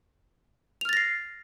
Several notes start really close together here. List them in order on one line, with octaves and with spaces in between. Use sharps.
F7 F6 A6 A#6 C7